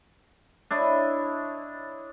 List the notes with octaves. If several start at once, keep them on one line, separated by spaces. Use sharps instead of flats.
D4 E4 C#5 D#5